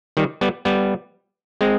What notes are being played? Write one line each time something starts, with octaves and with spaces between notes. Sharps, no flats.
D#3 G3
G3 B3
G3 B3
G#3 C4